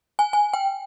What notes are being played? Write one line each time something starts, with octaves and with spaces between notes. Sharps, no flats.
G#5
G#5
G5